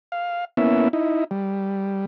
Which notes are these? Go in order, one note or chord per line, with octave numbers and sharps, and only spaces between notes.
F5
A#3 B3 C#4 E4 E5
D#4 E4
G3